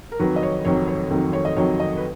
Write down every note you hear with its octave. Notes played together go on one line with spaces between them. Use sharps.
A#4
F2 D#3 F#3 B4
D#5
C#5
F2 D#3 F#3 C#5
C#5
F2 D#3 F#3
C#5
D#5
F2 D#3 F#3 C#5
D#5
B4